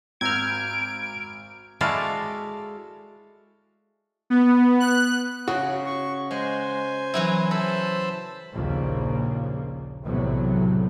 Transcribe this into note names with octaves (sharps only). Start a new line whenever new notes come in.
G#1 A#5 E6 F6 G6 G#6 D7
G#3 E4 F#4 A4 D5 F5
B3
F#6
C#3 F#4 C#5
C#6
G#3 C5 G#5
E3 F#3 E4
A4 C5 A5 B5
A#1 D#2 A#2 C#3 F3 A#3
B1 E2 A2 C3 F#3